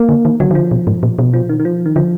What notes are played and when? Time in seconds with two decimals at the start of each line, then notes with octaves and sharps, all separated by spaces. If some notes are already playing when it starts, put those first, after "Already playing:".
Already playing: A#3
0.09 D3
0.25 D#3
0.40 D3 F#3
0.51 D#3
0.55 D3 F3
0.71 B2
0.87 G#2
1.03 A#2
1.19 B2
1.34 F3
1.49 D#3
1.60 D#3
1.65 F3
1.86 D#3
1.96 D3 F3